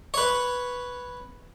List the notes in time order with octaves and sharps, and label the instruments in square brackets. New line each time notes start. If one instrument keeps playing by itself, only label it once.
[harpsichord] B4 C#5